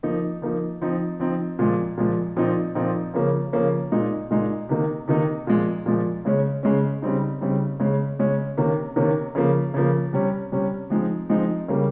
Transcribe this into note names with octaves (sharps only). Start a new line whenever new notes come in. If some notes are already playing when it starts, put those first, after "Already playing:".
F3 A#3 D#4
F3 A#3 D#4
F3 C4 D#4
F3 C4 D#4
A#2 F3 G#3
A#2 F3 G#3
A#2 F3 C4 D#4
A#2 F3 C4 D#4
C#3 F3 A#3 C#4
C#3 F3 A#3 C#4
A#2 G#3 D#4
A#2 G#3 D#4
C3 D#3 A#3 D#4
C3 D#3 A#3 D#4
A#2 F3 G#3
A#2 F3 G#3
C#3 G#3 C#4
C#3 G#3 C#4
C#3 G3 C4 D#4
C#3 G3 C4 D#4
C#3 G#3 C#4
C#3 G#3 C#4
C3 D#3 A#3 C#4
C3 D#3 A#3 C#4
C#3 F3 A#3
C#3 F3 A#3
C3 G3 C#4
C3 G3 C#4
F3 G#3 C4 D#4
F3 G#3 C4 D#4
C#3 G3 A#3